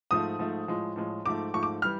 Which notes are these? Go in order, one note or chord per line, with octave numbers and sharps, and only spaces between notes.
G#2 F3 A3 D#6
G#2 F3 A3
A2 F3 G#3
A2 F3 G#3
G#2 F3 A3 D6
G#2 F3 A3 C#6
D6
E3 G3 F6